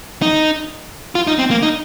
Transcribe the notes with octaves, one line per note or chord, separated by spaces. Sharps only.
D#4
F4
D#4
C4
A#3
D#4